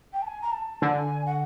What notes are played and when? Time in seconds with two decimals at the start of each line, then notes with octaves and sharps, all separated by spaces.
0.13 G5
0.22 A5
0.27 G#5
0.42 A#5
0.52 A5
0.82 D3 G#5
1.26 F#5